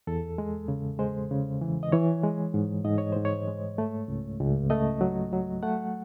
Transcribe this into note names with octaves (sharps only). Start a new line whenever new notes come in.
E2 A4
G#3
C#3
G#3 C5
C#3
E3
D#5
E3 C#5
G#3
G#2
G#2 D#5
C#5
G#2 C5
C#5
G#3
A3
C#2
C#2
A3 D#5
F#3
F#3
A3 F#5